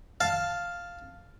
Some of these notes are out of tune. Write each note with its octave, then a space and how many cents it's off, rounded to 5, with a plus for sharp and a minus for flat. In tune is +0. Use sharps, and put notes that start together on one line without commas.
F5 +0 A5 +0